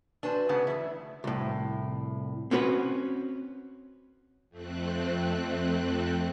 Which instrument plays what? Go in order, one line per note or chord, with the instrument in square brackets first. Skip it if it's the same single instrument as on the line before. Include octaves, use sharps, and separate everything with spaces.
[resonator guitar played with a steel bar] D4 C5 [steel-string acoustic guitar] F#4 B4 G#5
[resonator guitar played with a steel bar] G#2 C#3 B3
[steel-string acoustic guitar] E3 A3 [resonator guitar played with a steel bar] E4
[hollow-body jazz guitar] C2 A2
C4 C#4 F#4 B4
[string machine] F2 A3 C4 F#6